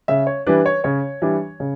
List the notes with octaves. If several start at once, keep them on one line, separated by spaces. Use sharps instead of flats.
C#3 E5
C#5
E3 G3 D4 B4
C#5
C#3 C#5
E3 G3 D4
C#3